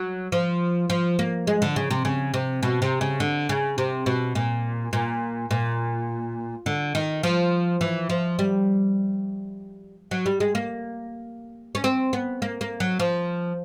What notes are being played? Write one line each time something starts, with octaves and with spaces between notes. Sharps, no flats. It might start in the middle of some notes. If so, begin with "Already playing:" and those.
Already playing: F#3
F3
F3
A#3
G#3
D3
C#3
C3
C#3
C3
B2
C3
C#3
D3
C#3
C3
B2
A#2
A#2
A#2
D3
D#3
F3
E3
F3
G3
F#3
G3
G#3
A#3
C#4
C4
B3
A#3
A#3
F#3
F3